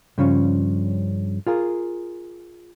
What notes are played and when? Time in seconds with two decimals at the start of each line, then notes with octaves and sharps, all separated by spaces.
0.18 G2 C#3 F3 C#4
1.47 F4 G#4 A#4